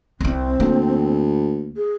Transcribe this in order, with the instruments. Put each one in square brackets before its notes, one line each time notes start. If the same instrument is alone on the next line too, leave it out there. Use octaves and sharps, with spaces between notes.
[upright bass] C2 E4 [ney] C4
[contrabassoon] D2 [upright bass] A#3
[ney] G#4